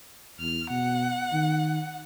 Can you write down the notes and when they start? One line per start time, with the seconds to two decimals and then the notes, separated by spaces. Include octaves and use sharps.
0.40 E2 F6
0.70 B2 F#5
1.33 D#3